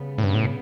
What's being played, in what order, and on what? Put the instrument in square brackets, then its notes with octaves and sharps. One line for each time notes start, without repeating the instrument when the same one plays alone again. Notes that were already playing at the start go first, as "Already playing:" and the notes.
Already playing: [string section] C#3 G3 B3
[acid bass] A2
G2
A2